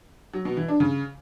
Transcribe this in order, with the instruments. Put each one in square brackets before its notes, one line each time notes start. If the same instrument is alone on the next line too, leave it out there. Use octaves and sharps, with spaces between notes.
[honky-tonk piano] F#3
B2
E3
D4
C#3